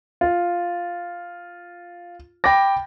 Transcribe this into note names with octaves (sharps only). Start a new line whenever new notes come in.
F4
G5 B5 D6 A#6